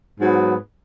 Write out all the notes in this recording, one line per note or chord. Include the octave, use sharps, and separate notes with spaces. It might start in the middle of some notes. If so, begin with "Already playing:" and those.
G#2 F#3 B3